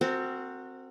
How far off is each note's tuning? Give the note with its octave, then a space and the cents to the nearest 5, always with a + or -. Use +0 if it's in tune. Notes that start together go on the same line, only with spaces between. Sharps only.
C4 +0 F#4 -5 A#4 -40